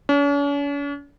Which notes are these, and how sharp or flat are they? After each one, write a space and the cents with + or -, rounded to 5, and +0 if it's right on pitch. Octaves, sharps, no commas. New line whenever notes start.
C#4 +45